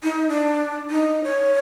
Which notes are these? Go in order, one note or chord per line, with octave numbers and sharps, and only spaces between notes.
D#4
D4
D#4
C#5